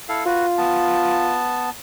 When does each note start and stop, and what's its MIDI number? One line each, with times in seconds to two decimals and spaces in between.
0.09 0.24 64
0.09 0.24 69
0.09 0.24 77
0.26 1.39 65
0.26 0.46 66
0.26 0.46 71
0.58 1.70 59
0.58 1.70 81